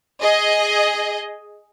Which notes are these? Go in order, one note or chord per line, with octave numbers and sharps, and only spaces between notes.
G#4 D#5